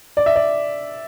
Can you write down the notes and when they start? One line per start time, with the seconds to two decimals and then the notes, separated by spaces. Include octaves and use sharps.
0.17 D5
0.26 E5
0.36 D5